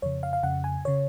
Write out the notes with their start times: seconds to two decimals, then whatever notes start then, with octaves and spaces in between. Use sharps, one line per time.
0.02 F2 C#3 C#5
0.23 F5
0.33 F5
0.43 F2 C#3 F#5
0.64 G#5
0.85 C#3 C#5